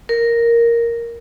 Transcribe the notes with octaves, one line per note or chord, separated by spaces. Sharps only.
A#4